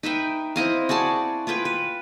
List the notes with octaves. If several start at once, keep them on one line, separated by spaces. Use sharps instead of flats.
D#4 B4 E5 G5
C4 E4 D#5 F5
F#4 G#4 D5 A5
F4 G#4 B4 G5
B4